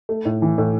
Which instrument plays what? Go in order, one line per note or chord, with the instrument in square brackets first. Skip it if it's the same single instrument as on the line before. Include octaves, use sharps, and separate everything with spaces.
[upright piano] A3
A2
E3
A2